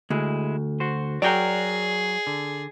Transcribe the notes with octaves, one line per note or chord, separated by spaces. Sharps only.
D2 G#3 E4
F#4 C5
F#3 F#4 G#4 A#4 D5 G5
D3